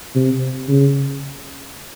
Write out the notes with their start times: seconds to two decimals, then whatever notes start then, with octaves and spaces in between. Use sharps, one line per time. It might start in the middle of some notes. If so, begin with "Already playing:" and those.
0.15 C3
0.68 C#3